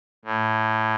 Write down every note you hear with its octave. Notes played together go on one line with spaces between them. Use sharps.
A2